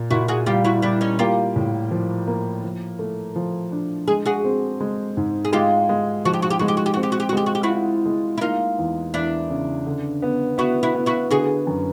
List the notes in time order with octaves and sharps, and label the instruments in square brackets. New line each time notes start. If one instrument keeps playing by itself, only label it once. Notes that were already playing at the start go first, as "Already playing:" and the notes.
Already playing: [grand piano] A#2
[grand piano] A#2 [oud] E4 F#4
[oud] F#4 G#4
[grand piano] G3 [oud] F4 G4
[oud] E4 F#4
[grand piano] G3 [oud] D4 E4
[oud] C#4 D#4
[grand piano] A#3 [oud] F4 G4
[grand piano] A2
F3
A#3
F3
A3
F3
D4
[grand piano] G#3 [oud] G#4
[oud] F#4 G#4
[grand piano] C4
G#3
G#2
[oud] G#4
[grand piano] G#3 [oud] F4 G4
[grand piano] G#3
[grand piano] F3 [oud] F#4
[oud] G4
F#4
G4
[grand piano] G#3 [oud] F#4
[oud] G4
F#4
G4
[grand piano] C4 [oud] F#4
[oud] G4
F#4
G4
F#4
[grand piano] G#3 [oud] G4
[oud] F#4
G4
E4 F#4
[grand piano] F4
G#3
[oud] E4
[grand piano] A#3 [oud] D#4 F4
[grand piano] E2
[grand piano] E2 [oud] D4 E4
[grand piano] C#3
D3
B3
[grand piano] B3 [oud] E4 F#4
[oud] E4 F#4
[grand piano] B3
[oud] E4 F#4
[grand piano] D3 [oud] F#4 G#4
[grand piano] F#2